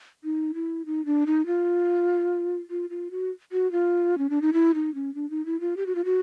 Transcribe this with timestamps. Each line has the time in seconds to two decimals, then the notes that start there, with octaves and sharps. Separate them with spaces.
0.24 D#4
0.54 E4
0.86 D#4
1.06 D4
1.27 D#4
1.46 F4
2.70 F4
2.90 F4
3.11 F#4
3.52 F#4
3.72 F4
4.18 C#4
4.30 D4
4.42 D#4
4.53 E4
4.75 D#4
4.95 C#4
5.15 D4
5.30 D#4
5.46 E4
5.60 F4
5.77 G4
5.86 F#4
5.95 F4
6.05 F#4